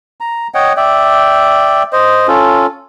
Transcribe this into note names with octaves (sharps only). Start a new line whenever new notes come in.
A#5
C#5 D#5 F#5 G5
D5 E5 G5
C5 D#5
C#4 F4 A4